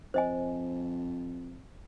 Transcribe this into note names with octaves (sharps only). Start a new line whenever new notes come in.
F2 C5 D#5 G#5